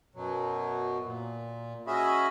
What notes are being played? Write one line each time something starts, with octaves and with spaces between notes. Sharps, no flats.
F#2 B2 F#3
A#2
C#4 F#4 G#4 D#5 E5 B5